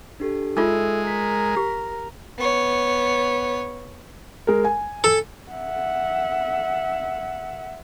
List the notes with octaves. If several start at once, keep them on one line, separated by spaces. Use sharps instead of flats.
D4 G4 A4
G#3 D#4 F4 A4 E5 E6
A#4 B6
G4
B3 C#5
G#3 A#4
G#5
A4
E5 F#5